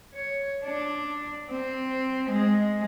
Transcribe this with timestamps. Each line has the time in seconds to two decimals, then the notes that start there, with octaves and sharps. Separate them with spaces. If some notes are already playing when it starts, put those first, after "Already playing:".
0.13 C#5
0.65 D4
1.51 C4
2.30 G#3